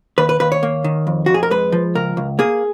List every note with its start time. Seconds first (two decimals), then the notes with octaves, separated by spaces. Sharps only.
0.18 D#2 B4
0.29 B4
0.40 D#2 B4
0.52 C#5
0.63 A#3
0.84 D#3
1.07 F2
1.26 F2 F#4
1.34 G#4
1.43 A#4
1.51 G#3 B4
1.72 F3
1.95 C#2 A#4
2.17 C#2
2.39 A#3 G#4